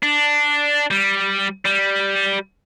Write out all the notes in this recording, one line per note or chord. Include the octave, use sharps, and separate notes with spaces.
D4
G3
G3